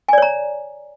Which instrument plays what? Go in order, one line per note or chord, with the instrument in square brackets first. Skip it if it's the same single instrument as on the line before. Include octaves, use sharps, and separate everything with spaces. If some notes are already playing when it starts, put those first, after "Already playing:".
[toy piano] G#5
D5
C#5
A#5